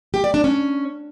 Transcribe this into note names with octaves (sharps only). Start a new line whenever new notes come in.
G4
D5
D4
C#4